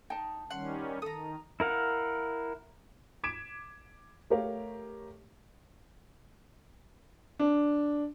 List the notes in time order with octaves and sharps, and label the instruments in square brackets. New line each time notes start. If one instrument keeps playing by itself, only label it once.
[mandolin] D#4 [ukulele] G5 A5
[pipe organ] D#3 G3 C#4 [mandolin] F#5 C6
[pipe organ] D#3 [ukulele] A4 [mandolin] A#5 D#6
[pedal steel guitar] E4 A#4 F5 F#5
[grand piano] D6 G#6 B6 D7 E7
A3 G4 A#4 C#5 F5
[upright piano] D4